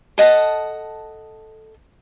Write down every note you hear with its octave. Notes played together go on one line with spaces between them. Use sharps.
A4 D#5 F#5 A5